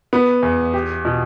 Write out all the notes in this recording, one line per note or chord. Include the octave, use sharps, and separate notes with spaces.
B3
E2
G4
B2